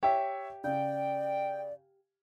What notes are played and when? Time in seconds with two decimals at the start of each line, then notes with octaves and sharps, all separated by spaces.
0.03 G4 C#5 E5
0.64 C#3 D5 G5